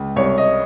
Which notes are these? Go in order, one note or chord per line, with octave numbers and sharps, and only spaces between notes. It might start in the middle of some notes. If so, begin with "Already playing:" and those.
Already playing: C#2
C2 C#5
D#5